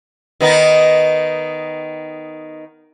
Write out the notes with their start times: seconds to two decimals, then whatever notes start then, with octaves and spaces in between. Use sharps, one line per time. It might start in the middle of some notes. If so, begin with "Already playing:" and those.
0.41 D#3 B3 D#4